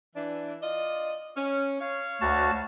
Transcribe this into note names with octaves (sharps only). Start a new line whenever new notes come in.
E3 D4
F4 D5 D#5
C#4
C#5 F5
D2 F#4 A5